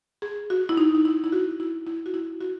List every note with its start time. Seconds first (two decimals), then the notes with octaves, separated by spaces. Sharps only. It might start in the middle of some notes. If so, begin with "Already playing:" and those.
0.22 G#4
0.50 F#4
0.69 E4
0.77 D#4
0.95 D#4
1.05 E4
1.24 E4
1.32 F#4
1.60 E4
1.87 E4
2.06 F#4
2.14 E4
2.41 F#4